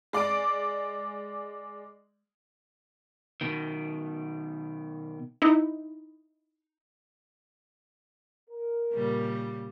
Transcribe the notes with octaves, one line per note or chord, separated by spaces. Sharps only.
G#3 D5 D6 D7
B2 D#3
D#4 E4
A#4
A#2 C#3 G3